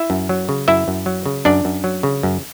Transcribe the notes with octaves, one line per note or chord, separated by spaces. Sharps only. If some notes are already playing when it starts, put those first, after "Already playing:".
Already playing: E4 E5
F#2
F#3
C#3
F#2 E4 E5
F#2
F#3
C#3
F#2 D4 D5
F#2
F#3
C#3
F#2